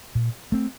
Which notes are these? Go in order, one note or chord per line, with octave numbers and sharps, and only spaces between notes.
A#2
A3 C4